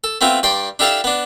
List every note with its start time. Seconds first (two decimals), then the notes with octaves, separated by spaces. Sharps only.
0.04 A4
0.21 A3 B3 C4 E4 F4
0.43 G2 D5 G5 C6
0.79 D4 E4 G4 A4 F5 A5
1.04 B3 D4